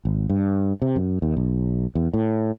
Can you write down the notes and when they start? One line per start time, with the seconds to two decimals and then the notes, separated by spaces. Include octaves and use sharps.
0.05 G#1
0.30 G2
0.82 C3
0.96 F#2
1.22 D#2
1.37 B1
1.95 E2
2.13 A2